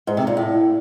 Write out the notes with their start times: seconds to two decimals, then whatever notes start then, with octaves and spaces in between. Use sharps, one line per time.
0.07 G#2
0.17 C3
0.27 A#2
0.37 A2